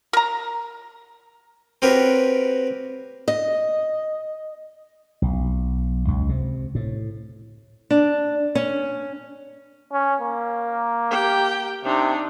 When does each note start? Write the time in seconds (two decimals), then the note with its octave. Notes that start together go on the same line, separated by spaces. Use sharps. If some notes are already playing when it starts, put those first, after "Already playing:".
0.13 A#4 A#5
1.82 C4 F#4 G4 A#4 B4 C#5
3.28 D#5
5.22 B1
6.08 C#2
6.29 C3
6.75 A2
7.91 D4
8.55 C#4
9.92 C#4
10.21 A#3
11.11 G4 G5
11.84 C3 D4 D#4